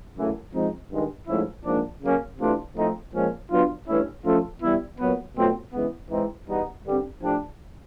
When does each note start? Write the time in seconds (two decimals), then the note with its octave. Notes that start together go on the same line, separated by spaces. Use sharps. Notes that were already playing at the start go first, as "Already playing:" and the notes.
0.17 F#2 C#3 E3 A3
0.54 F3 G#3 C4 D#4
0.91 G2 D#3 G#3
1.28 G#2 F3 A3 C#4 E4
1.65 G#2 F3 A#3 D4
2.02 C#3 F#3 A#3 C#4
2.39 C3 E3 A3 D4 F4
2.76 A2 F3 A3 C4 D#4
3.13 A#2 F3 G#3 C#4
3.51 F#3 B3 D4 F4
3.88 G2 E3 A3 C#4 E4
4.25 F3 A3 C#4 F4 A4
4.62 E3 G3 B3 E4
4.99 A#2 F#3 B3
5.36 B2 F#3 A3 C4 F4
5.74 C#3 E3 G#3 B3
6.10 G#2 E3 G#3 C4 D#4
6.48 E2 B2 G3 B3 D#4
6.85 G2 D3 G3 C4
7.22 A2 F3 A3 D4 G4